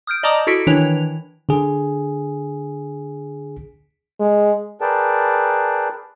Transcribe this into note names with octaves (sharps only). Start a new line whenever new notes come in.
D#6 F6 G6 D7
D5 D#5 A5 A#5 D6 D#6
E4 F#4 A4 B6 D7
D#3 E3 D4 E4 C#5 F7
D3 G#4
G#3
G#4 A#4 B4 D5 G5 A5